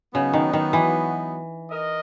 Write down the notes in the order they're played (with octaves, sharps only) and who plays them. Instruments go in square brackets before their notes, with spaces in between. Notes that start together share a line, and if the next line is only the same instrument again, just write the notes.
[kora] C#3 [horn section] F#3 B3 D#4 F#4
[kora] D#3
D#3
E3
[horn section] A#4 D#5